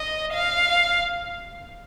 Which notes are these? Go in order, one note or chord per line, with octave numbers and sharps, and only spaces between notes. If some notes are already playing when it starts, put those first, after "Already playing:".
Already playing: D#5
F5